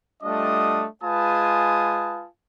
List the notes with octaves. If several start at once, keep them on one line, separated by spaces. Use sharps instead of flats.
G3 A3 D4 F4 D#5 D#6
G#3 F4 B4 G#5 A5 D#6